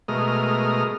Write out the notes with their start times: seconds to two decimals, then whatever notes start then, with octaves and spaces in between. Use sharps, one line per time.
0.08 B2 G#3 A3 A#4 D#6 F6